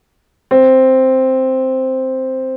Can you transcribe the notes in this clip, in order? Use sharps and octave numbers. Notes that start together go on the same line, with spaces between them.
C4